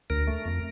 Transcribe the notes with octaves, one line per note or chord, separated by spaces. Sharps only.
D2 A#4
A3
F2